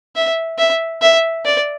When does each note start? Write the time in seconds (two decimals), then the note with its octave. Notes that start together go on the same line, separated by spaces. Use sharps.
0.15 E5
0.58 E5
1.02 E5
1.46 D5